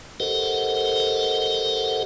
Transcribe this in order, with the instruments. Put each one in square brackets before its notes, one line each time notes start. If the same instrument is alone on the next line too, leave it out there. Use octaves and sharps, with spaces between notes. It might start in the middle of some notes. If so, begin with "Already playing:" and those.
[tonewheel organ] G4 A4 A#4 C5 D#5 F#5